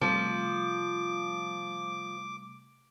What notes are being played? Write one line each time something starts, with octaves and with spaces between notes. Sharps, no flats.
C3 F3 G3 A3 D6